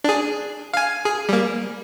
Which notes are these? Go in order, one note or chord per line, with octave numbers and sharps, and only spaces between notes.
D4 G#4
F5 G#5
G#4
G3 A#3